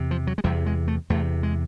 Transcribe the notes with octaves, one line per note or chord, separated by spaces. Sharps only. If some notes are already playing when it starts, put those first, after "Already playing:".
Already playing: E2 C3
F3
F#3
G#3
E2 C3 G3
G#3
A3
E2 C3 A3
G#3